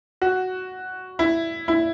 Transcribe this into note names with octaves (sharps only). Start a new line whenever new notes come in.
F#4
E4
E4